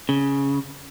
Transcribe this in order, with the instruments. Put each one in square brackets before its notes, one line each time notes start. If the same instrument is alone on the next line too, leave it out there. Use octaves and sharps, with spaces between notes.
[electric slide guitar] C#3